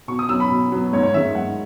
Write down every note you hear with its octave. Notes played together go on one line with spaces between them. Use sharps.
B2 C#6
D#6
F#3 B3 E6
B5
B2
F#3 B3
G#2 C#5
C#5
D#3 G#3 E5
G#2 F#5